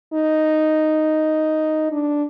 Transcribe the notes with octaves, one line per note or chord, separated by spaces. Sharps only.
D#4
D4